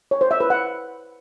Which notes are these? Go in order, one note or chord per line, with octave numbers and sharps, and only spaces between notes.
C#5
C5
E5
B4
F#5